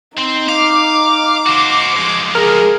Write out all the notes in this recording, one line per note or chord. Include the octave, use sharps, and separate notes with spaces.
C4 D#4
F5 D6
F#4 C5
F3 G#3
G#4 A#4